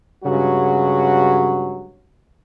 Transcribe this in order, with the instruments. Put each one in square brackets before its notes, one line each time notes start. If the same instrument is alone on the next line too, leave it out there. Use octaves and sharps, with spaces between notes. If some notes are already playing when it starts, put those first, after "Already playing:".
[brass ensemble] G2 C#3 F#3 G#3 F#4